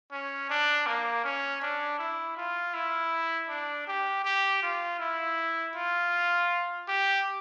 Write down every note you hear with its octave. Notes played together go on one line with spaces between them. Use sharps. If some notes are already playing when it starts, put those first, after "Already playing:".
C#4
D4
A#3
C#4
D4
E4
F4
E4
D4
G4
G4
F4
E4
F4
G4